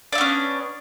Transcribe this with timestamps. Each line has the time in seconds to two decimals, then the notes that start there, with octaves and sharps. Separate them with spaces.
0.13 D4
0.15 E4
0.18 B3
0.21 C#4